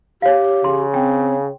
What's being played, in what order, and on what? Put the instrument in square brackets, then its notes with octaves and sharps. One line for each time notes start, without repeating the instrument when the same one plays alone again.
[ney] G4 [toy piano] C#5 F5
[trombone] C#3 [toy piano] C6
[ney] C4 [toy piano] G5